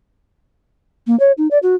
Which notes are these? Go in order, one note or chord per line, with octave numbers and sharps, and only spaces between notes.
A#3
C#5
D#4
D5
F#4